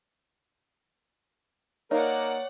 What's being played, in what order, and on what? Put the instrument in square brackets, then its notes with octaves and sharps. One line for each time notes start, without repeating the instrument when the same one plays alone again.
[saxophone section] A#3 A#4 [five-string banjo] D#4 [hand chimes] C#5 [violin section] D5 F#5